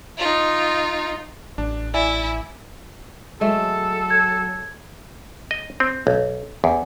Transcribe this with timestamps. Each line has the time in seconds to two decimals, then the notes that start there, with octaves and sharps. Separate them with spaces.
0.18 D#4 F4
1.58 A1 D4
1.94 E4 D5 E5 G#5
3.41 F#3 G#3 A3 A4
4.10 G#6
5.51 D#5
5.80 C4
6.07 B1
6.64 E2